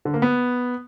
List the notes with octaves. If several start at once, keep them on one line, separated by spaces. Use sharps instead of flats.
D3
A#3
B3